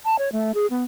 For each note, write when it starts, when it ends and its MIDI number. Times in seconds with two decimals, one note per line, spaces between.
0.05 0.18 81
0.19 0.32 73
0.32 0.52 57
0.55 0.66 68
0.70 0.84 59